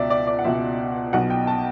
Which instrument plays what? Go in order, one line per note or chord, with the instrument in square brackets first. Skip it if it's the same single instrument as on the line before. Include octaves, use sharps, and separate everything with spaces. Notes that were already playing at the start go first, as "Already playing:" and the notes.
Already playing: [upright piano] C#2 B2 D5 E5
D5
D5
F#5
C#2 B2 E5
B1 B2 F#5
G5
A5